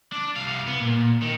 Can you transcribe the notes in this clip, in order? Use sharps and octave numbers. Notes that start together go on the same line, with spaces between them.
D4
C2 F5
B3
A#2
D#3